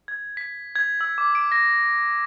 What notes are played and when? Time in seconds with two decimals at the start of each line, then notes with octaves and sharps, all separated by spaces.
0.08 G#6
0.37 B6
0.76 G#6
1.01 E6
1.18 D6
1.35 D7
1.52 A#6